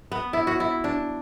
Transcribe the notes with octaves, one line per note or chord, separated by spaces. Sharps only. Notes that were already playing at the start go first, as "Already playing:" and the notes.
B3
E4
F#4
E4
D4